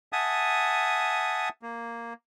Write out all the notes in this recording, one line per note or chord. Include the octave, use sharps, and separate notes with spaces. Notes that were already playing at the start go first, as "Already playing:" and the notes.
E5 F#5 G#5 A5 D#6
A#3